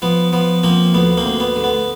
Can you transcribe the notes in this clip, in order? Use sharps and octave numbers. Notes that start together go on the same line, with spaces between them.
F3 B3
F3 B3
F3 A#3 C4
D2 B3
A#3 C4
D2
B3
D3
B3